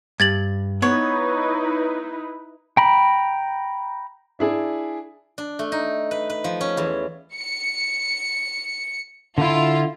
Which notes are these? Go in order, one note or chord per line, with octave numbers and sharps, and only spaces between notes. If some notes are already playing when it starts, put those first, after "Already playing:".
G2 G#6 A6 F#7
B3 D#4 E4 B4 C#5
G5 A#5 B5
D4 E4 G#4 D5
D4
A3
D#4
B4
B4
F3
C#4
E2
C#7
D3 E4 F4